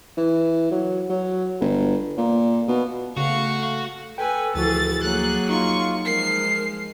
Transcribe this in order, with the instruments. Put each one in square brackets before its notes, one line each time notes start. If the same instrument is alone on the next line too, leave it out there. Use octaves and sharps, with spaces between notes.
[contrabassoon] E3
F#3
F#3
G1
A#2
B2
[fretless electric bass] C#3 [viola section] A3 [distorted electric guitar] F#4 [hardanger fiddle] F5 C#6
[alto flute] A4 [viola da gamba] B4 [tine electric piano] G5 [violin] G#5
[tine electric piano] D2 F3 F#4 [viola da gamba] E3 G#4 [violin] A6
[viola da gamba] F#3 A#3 G#4 [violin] F#6
[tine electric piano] D#4 [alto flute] F4 [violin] C#6
[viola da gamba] F3 G#3 [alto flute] A#4 [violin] C7